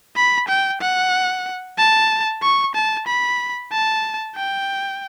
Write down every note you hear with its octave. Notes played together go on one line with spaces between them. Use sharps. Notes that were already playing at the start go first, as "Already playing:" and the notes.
B5
G5
F#5
A5
C#6
A5
B5
A5
G5